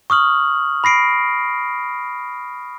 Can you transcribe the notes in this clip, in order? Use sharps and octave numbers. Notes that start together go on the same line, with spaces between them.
C#6 D#6 F6 F#7
B5 A#6 C7 D7